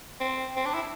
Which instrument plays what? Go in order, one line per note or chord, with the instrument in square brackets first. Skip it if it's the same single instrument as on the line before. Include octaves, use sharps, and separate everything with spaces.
[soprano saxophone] C4
C4
D4
E4